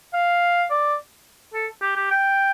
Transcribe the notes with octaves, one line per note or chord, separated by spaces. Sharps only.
F5
D5
A4
G4
G4
G5